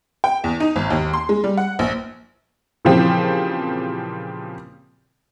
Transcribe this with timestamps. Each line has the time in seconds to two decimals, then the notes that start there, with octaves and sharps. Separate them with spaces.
0.24 G5
0.44 E2
0.60 D#4
0.76 G#1
0.90 D#2
1.13 C6
1.29 G#3
1.44 G3
1.57 F#5
1.79 A#1
2.85 A#2 C#3 E3 F3 C4 G4